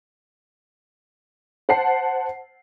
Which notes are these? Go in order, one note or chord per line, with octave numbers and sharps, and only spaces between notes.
C5 F#5 A5 C7